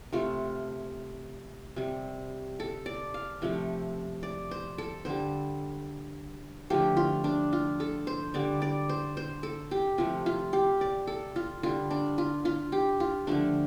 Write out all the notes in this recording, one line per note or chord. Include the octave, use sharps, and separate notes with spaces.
C3 A3 F4
C3 G3
A4
D5
F5
C3 F3 A3
D5
C5
A4
D3 G3 C5
D3 F3 A3 G4
F4
D4
F4
A4
C5
D3 G3 D5
D5
C5
C5
A4
G4
C3 F3 A3 F4
F4
G4
D5
A4
F4
D3 G3 F4
D4
F4
F4
G4
F4
D3 F3 A3 D4